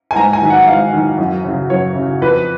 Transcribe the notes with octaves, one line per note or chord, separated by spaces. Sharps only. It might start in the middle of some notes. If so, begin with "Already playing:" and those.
G#5
G#2 A#5
G#5
D#3 F#3
F#5
G#2 F5
D#3 F#3
F#2
C#3 F#3
F#2 C#5
C#3 F#3
F2 B4